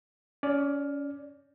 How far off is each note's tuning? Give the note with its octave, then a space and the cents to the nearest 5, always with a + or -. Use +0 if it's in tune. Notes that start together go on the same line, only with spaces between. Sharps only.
C#4 +25 D5 +0